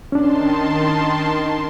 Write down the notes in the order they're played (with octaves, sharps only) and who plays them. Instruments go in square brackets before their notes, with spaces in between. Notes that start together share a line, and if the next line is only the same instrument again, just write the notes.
[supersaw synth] D#3 A5 C6 [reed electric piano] C#4 D4